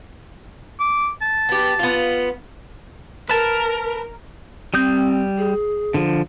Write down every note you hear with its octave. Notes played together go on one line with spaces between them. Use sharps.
D6
A5
B3 G4
B3 F4
A#4 B4 A5
G3 C4 D#6 G6
G#4
D3 F3